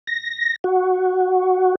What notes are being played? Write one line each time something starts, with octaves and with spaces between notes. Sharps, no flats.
A#6
F#4